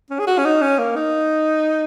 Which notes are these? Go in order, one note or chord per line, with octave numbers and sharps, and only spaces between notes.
C#4
G#4
F#4
C#4
D#4
C#4
A#3
D#4